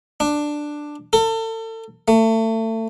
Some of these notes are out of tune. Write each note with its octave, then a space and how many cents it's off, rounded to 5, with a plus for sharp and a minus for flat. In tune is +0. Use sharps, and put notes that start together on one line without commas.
D4 +10
A4 +35
A3 +30